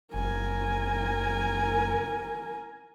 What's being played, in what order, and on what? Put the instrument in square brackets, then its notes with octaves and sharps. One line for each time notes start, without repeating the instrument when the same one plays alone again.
[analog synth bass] F#1 [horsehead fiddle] A#4 G#5